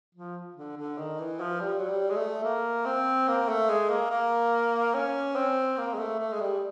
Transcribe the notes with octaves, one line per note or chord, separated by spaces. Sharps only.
F3
D3
D3
D#3
E3
F3
G3
F#3
G3
G#3
A3
A#3
C4
A#3
A3
G#3
A#3
A#3
C#4
C4
A#3
G#3
A3
A3
G#3
G3